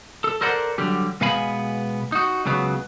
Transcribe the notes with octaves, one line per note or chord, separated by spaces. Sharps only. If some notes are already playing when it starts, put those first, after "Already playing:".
A4
A4 A#4 C5 D5 F#5
D3 F#3 G3 G4
B2 G#3 B3 F5 G#5 B5
D#4 F#4
C#2 C#3 F#3 B3